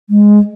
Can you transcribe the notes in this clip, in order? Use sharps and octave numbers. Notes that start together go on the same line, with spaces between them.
G#3